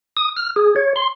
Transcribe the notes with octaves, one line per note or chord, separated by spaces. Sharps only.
D#6
F6
G#4
C#5
C6